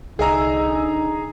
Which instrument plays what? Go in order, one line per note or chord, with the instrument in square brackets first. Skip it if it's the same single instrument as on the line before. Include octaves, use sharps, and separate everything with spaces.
[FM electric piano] C2 D#5 E6 [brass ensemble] D3 D#4 [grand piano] G#4 G#5 A#5